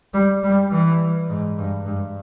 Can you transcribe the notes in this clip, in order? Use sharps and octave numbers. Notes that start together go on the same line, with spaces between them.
G3
G3
E3
G#2
G2
G2